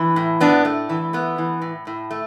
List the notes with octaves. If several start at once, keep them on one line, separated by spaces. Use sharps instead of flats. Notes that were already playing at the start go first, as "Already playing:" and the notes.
Already playing: E3
A2
A2 B3 D4
A3
E3
A3 B3
E3
A2
A2
A3